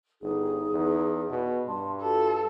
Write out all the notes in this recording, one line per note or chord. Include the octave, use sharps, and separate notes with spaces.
G1 D#4 G#4
E2
B2
G2 A5 C6
F4 F#4 A4